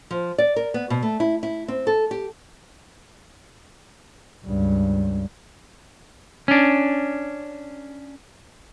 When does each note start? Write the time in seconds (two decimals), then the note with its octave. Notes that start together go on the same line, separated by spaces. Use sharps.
0.11 F3
0.38 D5
0.56 A#4
0.74 B3
0.90 B2
1.02 A3
1.20 E4
1.43 E4
1.68 C4
1.87 A4
2.11 G4
4.45 C#2 G2
6.48 C#4 D4